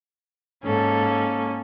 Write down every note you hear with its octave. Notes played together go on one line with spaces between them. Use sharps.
G#2 A#3 C#4 A4